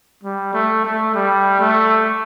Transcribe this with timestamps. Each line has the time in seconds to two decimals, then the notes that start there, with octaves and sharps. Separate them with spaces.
0.23 G3
0.54 A3
0.85 A3
1.15 G3
1.60 A3